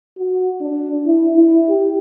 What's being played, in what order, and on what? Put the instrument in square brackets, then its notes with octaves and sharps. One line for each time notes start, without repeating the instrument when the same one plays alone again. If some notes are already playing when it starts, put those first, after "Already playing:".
[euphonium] F#4
D4
E4
E4
G4